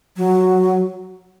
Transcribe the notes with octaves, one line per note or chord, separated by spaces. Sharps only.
F#3